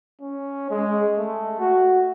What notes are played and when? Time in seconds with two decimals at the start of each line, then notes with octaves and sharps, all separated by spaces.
0.21 C#4
0.70 G#3
1.18 A3
1.59 F#4